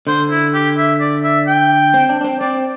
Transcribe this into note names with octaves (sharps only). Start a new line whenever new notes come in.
D3 C5
E4
G4
E5
D5
E5
G5
C4
D4
D4
C4
C4 D5